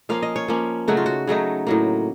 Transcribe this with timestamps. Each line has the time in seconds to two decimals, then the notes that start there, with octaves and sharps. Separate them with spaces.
0.09 F3 A#3 C#4 F5
0.22 D#5
0.36 C#5
0.48 F3 A#3 C#4
0.88 C#3 F#3 A3 D#4 F#4
0.97 F4
1.06 F#4
1.27 C#3 F#3 A3 D#4
1.67 A2 F#3 A#3